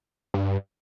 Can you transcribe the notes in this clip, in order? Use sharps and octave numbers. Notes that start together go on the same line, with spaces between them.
G2